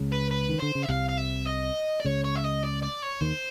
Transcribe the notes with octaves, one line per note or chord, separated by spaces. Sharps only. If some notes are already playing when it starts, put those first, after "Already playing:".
Already playing: C#2 C#3
B4
B4
D#3
D3 C5
C#3
E5
C2 C3 F5
F5
E5
D#5
D5
C#2 C#3 C#5
C#5
E5
D#5
D5
D5
C#5
D#2 D#3 C5